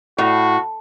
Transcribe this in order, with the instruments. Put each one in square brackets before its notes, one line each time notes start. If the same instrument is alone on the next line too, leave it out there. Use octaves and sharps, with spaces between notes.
[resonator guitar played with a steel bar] A2 [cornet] F#4